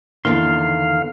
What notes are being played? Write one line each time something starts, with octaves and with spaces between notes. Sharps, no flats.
E2 D3 D#3 A#3 F5 C6